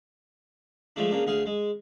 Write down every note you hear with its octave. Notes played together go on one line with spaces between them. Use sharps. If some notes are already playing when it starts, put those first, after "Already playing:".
F3 G#3 A3 D4
C#3 A#3 D4
D2 G#4 F5
G#3